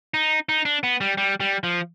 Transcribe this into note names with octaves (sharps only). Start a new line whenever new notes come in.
D#4
D#4
D4
B3
G3
G3
G3
F3